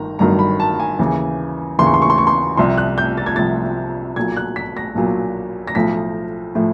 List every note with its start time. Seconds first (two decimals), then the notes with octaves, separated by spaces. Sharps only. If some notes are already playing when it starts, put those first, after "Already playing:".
Already playing: G1 D#3 A#5
0.19 G1 G2 D#3 F#3 A#5
0.39 B5
0.60 A5
0.80 G#5
0.99 D#2 C#3 E3
1.79 D#2 C#3 E3 C6
1.86 C#6
1.94 C6
2.02 C#6
2.10 C6
2.18 C#6
2.27 C6
2.57 C2 C3 F3 C6
2.77 F#6
2.98 G6
3.17 A6
3.26 G#6
3.36 C2 C3 F3 A6
4.16 B1 A#2 F#3 G#6
4.37 F#6
4.56 B6
4.77 A#6
4.95 B1 A#2 F#3
5.68 A#6
5.75 B1 A2 F3 B6
6.55 A2 F3